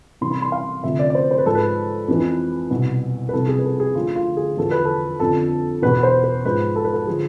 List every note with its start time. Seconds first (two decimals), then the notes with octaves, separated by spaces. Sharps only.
0.21 C2 C3 E3 C6
0.31 B5
0.42 C6
0.52 F5
0.84 D2 C3 F3 E5
0.99 D5
1.10 D5
1.15 C5
1.31 C5
1.38 B4
1.46 G#2 F3 A4
1.55 B4
2.08 F2 E3
2.70 C2 B2
3.29 B4
3.33 C2 C3 F3 A4
3.48 G#4
3.59 B4
3.65 A4
3.80 G#4
3.95 D2 D3 F3 F4
4.16 F4
4.37 G#4
4.57 E2 D3 F3 A4
4.71 B4
4.85 A4
5.20 F2 D3 F3 A4
5.82 E2 B2 B4
6.03 C5
6.24 B4
6.45 G#2 F3 B4
6.76 A4
6.84 B4
6.93 A4
7.07 D3 F3 G#4